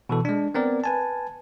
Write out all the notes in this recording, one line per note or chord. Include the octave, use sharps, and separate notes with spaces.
B2 E3 A4
G#3 D4
B3 C4 A#4 D5
B4 G#5 A5